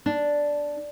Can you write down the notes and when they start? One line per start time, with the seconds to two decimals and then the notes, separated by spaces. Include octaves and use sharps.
0.06 D4